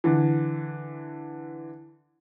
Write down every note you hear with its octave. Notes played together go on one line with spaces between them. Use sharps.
D3 E3